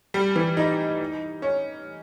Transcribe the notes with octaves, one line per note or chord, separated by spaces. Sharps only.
G3
E3
D#4
C#4